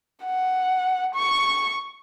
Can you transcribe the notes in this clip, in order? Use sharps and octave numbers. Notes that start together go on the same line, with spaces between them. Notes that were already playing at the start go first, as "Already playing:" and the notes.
F#5
C#6